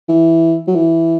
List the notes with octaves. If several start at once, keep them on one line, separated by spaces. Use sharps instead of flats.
E3
F#3
E3